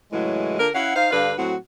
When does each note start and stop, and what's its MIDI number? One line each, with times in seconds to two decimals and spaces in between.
0.12 0.56 45
0.12 0.56 49
0.12 0.56 52
0.12 0.56 54
0.12 0.56 56
0.59 0.69 50
0.59 0.69 65
0.59 0.69 70
0.74 0.93 61
0.74 0.93 64
0.74 0.93 77
0.74 0.93 78
0.95 1.11 63
0.95 1.11 72
0.95 1.11 77
1.11 1.33 43
1.11 1.33 50
1.11 1.33 71
1.11 1.33 77
1.38 1.55 45
1.38 1.55 54
1.38 1.55 60
1.38 1.55 66